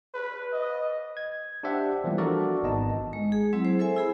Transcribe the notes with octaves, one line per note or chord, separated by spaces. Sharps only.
B4
D#5
G#6
D4 G4 C5 E5 F#5 G5
E3 F3 G3 A#3 B3
D4 F#4 A4 A#4 D5
G#1 B3 D#4 D#5 A5
G#3
G#4
F#3 C4 E4
C5
A4 C5 E5 G#5
E4 G#4 B5